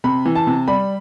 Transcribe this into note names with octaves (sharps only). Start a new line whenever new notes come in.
C3 B5
E3
A5
C3
G3 B5